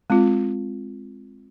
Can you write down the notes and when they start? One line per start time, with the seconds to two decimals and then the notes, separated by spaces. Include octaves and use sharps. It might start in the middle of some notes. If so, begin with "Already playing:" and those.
0.10 G#3 C4 F4